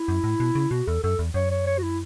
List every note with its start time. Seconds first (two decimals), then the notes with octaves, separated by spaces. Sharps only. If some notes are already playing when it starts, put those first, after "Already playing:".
Already playing: E4
0.08 F#2
0.24 A2
0.40 B2
0.55 C#3
0.71 B2 F#4
0.87 E2 A4
1.03 F#2 A4
1.19 E2
1.34 F#2 C#5
1.51 C#5
1.66 C#5
1.78 F#4
1.83 E4